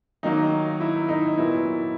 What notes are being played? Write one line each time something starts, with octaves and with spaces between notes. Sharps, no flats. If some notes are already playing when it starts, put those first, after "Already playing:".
D#3 F#3 A#3 D#4
E4
D#4
A#2 F#3 B3 E4